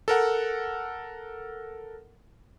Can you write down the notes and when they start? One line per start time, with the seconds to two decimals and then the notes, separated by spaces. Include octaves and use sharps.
0.08 A4 A#4 F#5